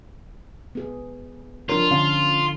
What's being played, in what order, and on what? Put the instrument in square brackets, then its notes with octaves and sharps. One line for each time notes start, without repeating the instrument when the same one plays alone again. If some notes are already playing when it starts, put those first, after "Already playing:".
[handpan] B3 G#4
[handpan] F3 D4 C#5 [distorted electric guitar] F4 [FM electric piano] A#4
[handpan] D3 F5 [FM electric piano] C#4